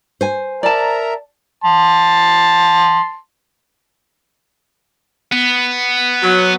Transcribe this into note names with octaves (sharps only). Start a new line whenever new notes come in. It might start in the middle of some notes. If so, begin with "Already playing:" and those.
C5 G#5
A#4 D5 E5 A5 A#5
A5 C6
B3
F#3